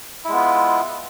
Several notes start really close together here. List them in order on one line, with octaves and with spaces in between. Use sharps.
E4 G#3 B3 F4